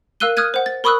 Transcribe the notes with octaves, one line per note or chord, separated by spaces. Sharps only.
A#4 F5 E6 F#6 D#7 G7
D#6 F6 F#6 G#6 D#7
C5 F#5
A6
A#4 B5 C#6 D#6 E6 F#6